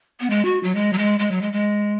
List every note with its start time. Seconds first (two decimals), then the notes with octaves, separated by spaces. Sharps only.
0.20 B3
0.30 G#3
0.45 F#4
0.63 F#3
0.75 G#3
0.93 F#3
0.98 G#3
1.19 G#3
1.31 F#3
1.41 G#3
1.53 G#3